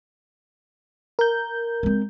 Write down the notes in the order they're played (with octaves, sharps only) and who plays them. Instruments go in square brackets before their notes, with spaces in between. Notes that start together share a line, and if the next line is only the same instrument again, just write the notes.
[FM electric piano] A#4 G6
[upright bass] G#3 C4